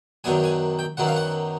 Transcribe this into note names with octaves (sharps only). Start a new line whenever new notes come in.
F#2 D#3 F#3 B3 D4 G#5
G#5
G5
F#2 D#3 F#3 B3 D4 F#5
F5
F#5